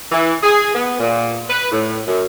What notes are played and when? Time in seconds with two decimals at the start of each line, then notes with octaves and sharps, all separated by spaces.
0.12 E3
0.43 G#4
0.74 B3
0.99 A#2
1.49 B4
1.72 A2
2.07 F#2